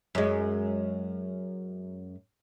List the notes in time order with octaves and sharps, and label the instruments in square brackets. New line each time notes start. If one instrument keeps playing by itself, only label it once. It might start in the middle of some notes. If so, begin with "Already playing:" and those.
[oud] F#2 G#3